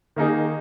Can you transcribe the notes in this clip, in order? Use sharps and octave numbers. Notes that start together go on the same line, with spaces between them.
D#3 A#3 D#4 G#4